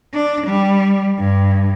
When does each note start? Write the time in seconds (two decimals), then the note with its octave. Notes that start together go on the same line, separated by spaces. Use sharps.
0.13 D4
0.47 G3
1.19 G2